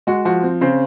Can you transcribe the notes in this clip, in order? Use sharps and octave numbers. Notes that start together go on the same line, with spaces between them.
G#3 F#4
F3 F#4
C4
C#3 C4 C5